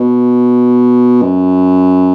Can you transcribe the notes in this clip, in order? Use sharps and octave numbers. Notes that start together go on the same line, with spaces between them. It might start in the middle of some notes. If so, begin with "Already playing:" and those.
Already playing: B2
F#2